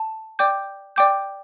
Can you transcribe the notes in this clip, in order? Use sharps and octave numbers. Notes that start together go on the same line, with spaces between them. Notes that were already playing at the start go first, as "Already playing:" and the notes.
Already playing: A5
D5 G5 D6 G6
D5 G5 D6 G6